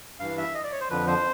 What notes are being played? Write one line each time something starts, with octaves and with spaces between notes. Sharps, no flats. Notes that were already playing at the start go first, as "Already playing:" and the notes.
G2 E3 F5
E5
D#5
D5
C#5
C5
F2 D3 F3 B4
C5